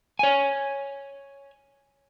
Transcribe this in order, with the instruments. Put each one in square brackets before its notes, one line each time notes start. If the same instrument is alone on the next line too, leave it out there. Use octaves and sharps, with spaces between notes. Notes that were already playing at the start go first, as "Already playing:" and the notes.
[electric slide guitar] C#5 G#5